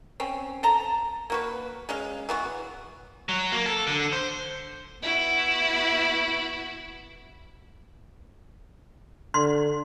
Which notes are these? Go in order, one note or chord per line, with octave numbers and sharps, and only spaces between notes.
C4 C#4
A4 A5 A#5
A#3 F#4 B4
G#3 C#4 F5
E3 B3 F#4
F#3
A#3
A4
D3
C5
B3 E4 F#4
D3 C6